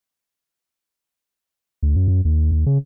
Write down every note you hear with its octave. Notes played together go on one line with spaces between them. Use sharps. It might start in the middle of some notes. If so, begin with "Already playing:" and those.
D2
F#2
F#2
D#2
D#2
C#3